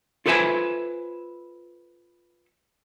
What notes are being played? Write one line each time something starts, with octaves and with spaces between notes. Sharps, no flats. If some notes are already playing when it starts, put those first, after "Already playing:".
F4 A4 B4 C5 E5 G#5